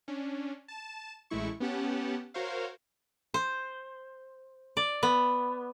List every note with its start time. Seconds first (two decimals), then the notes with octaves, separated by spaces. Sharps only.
0.08 C#4 D4
0.68 A5 E7
1.30 A1 G#3 A3 E4 C#6
1.60 B3 C#4 G4 F#5 A5
2.34 F#4 A#4 C5 C#5 F5
3.34 C5
4.77 D5
5.03 B3